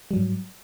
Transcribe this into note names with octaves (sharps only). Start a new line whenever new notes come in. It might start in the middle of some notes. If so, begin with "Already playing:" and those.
G#2 F#3 G3